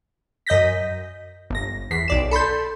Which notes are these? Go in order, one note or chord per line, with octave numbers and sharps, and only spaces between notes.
F#2 D#5 G6 A#6 B6
G1 A#6
E2 B6 C7
B1 D5 E7
A4 B5 C6 G6